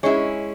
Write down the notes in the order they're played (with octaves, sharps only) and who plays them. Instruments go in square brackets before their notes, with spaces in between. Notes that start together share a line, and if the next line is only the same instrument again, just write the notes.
[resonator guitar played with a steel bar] G#3 C#4 E4 [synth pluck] C#5 C#6